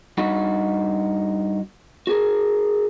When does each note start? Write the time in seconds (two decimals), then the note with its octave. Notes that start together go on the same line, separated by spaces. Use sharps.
0.18 G2 D#4 F#4 B5
2.07 F#4 G#4 A#4